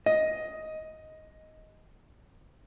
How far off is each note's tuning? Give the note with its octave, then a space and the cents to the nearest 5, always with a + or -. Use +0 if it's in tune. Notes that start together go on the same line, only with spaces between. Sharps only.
D#5 +10